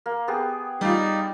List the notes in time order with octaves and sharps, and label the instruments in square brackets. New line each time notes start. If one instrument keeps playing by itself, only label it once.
[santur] A#3
B3 G4 G#4
[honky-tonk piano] G3 F4 [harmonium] D#4 D5